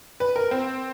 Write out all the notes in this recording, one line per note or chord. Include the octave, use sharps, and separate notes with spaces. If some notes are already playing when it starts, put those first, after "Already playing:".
B4
A#4
C4